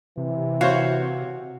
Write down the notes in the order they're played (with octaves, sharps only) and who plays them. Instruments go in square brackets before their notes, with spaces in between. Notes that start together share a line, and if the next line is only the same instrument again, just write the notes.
[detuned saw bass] C3 [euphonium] E3
[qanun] F#4 [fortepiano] C5 C#5 F5